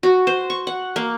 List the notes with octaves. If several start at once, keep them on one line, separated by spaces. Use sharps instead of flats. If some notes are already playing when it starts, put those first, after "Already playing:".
F#4
C5
C#6
F#5
A#3